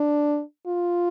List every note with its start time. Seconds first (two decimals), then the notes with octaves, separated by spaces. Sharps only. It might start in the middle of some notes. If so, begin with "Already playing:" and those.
Already playing: D4
0.67 F4